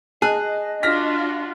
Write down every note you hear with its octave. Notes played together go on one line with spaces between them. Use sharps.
G#4 D#5 A5 F#6
D4 F4 F#4 F6 A#6 B6